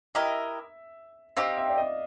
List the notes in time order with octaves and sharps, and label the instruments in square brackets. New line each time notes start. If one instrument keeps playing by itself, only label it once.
[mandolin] E4 G4 A#4 D#5 [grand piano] E5
[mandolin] C4 D#4 G4 [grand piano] F5
[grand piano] E5
D5
D#5